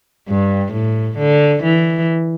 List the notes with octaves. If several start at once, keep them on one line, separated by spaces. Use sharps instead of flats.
G2
A2
D3
E3